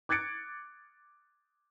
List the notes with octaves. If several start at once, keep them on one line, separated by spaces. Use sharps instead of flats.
D6 F#6 G#6 A6 C#7 D7